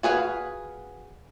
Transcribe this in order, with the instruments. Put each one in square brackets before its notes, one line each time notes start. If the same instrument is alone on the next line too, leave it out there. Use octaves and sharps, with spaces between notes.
[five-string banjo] F#4 G#4 B4 F5